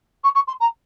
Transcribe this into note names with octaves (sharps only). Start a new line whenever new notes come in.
C#6
C#6
C6
A#5